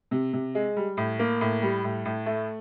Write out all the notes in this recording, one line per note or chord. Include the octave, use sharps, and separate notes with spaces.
C3
C3
G#3
G3
A2
A#3
A2
G3
A2
A2
A3